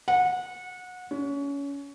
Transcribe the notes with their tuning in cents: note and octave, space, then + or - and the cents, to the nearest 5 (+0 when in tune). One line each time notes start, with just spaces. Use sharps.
F#5 -25
C#4 +25